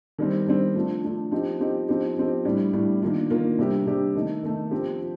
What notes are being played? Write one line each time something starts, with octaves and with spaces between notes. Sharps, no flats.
D#3 G3 C4
D#3 G3 C4
F3 A3 D4 F4
F3 A3 D4 F4
F3 C4 D#4 G4
F3 C4 D#4 G4
F3 C4 D#4 G4
F3 C4 D#4 G4
A2 G3 D4
A2 G3 D4
D#3 A#3 D4 F4
D#3 A#3 D4 F4
C3 G3 D4 G4
C3 G3 D4 G4
D#3 A3 D#4
D#3 A3 D#4
F3 C4 G4
F3